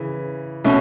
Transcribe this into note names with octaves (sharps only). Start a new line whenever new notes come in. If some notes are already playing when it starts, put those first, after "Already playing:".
Already playing: C#3 E3
B2 A3 C#4